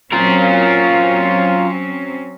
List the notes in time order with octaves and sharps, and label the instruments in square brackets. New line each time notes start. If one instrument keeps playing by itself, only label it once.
[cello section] F#3 C4 C#4 [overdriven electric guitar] F4 A#4